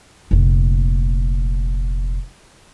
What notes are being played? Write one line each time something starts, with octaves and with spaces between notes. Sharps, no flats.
F1 A#2